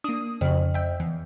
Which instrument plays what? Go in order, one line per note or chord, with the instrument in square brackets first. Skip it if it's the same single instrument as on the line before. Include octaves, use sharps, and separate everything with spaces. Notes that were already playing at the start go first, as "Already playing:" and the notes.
[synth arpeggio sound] A#3 D4 [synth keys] D#6
[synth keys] F2 [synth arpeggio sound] C#3
[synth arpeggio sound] E5 G5
E2